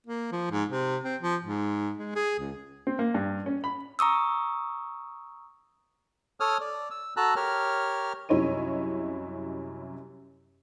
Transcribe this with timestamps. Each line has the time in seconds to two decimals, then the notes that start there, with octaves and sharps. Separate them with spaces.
0.07 A#3
0.32 F3
0.51 G#2
0.69 C3
1.04 C4
1.21 F3
1.43 G#2
1.98 G#3
2.16 G#4
2.39 C#2
2.87 C4
2.99 A#3
3.14 G2
3.46 C#4
3.64 B5
3.99 A#5 C#6 D#6 E6
6.40 A4 C#5 D#6 F6
6.60 D5
6.91 E6
7.17 F#4 A4 A5 A#5 E6 F#6
7.36 G4 A#4 C#5 F6
8.29 C2 F#2 E4 C#5 D#5 D#7